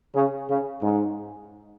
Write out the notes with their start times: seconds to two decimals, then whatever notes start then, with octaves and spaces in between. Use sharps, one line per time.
0.15 C#3
0.49 C#3
0.82 G#2